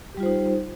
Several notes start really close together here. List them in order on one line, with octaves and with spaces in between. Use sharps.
G4 G3 F4 C5 D#4